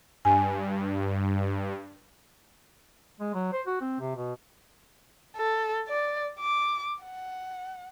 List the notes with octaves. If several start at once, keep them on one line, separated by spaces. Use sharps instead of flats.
G2 G#5
G#3
F#3
C5
F#4
C4
C3
B2
A4
D5
D6
F#5